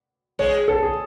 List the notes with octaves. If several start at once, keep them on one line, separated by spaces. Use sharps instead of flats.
G#3 C#5
A4
G#4